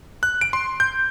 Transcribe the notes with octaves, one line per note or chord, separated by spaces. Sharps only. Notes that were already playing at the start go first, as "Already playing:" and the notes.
F#6
D7
C6
G6